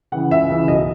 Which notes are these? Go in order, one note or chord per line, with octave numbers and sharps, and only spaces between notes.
C#3 E3 F#5
C#2 E5
C#3 E3
B1 D#5